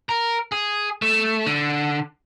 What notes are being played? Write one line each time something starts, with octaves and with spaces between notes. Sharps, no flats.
A#4
G#4
A3
D3